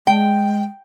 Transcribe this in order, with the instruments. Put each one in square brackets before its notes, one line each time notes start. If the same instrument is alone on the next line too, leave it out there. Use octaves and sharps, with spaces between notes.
[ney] G#3 [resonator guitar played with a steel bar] G5